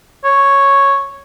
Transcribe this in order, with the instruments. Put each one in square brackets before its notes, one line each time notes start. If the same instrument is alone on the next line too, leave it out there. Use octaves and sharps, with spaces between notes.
[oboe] C#5